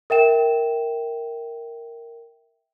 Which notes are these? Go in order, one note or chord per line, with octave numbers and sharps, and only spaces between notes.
A#4 E5 G5 E7